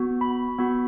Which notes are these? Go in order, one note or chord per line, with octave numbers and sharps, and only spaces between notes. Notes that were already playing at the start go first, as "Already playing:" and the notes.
Already playing: B3 F#4
B5
B3 F#4